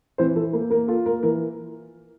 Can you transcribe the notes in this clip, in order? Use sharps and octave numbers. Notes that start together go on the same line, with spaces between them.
E3 C4 C5
E3 A4
A#3 A4
A#3 A#4
F4 A4
A#3 A#4
E3 A#4